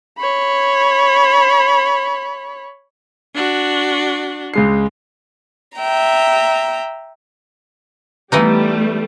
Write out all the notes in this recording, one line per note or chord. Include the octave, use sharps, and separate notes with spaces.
C#5 B5
D4 F#4
C#2 G#3 C7
E5 G5 A#5
E3 G3 A3 B3 D#4